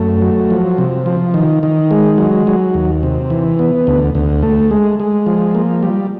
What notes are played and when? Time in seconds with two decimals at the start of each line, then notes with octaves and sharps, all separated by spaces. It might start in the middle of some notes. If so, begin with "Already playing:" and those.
Already playing: F#2 A3
0.22 F#3
0.50 F3
0.78 C3
1.06 F3
1.34 D#3
1.63 D#3
1.91 G#3
2.18 F#3
2.47 F#3
2.74 D#2
3.03 C3
3.30 E3
3.59 B3
3.87 D2
4.15 D2
4.43 A3
4.71 G#3
5.00 G#3
5.26 F3
5.55 A#3
5.83 G3